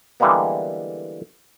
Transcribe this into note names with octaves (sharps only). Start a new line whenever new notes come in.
D3 E3 G3 G#3 A#3 B3